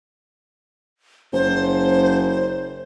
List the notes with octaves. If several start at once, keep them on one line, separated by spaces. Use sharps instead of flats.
F#1 C5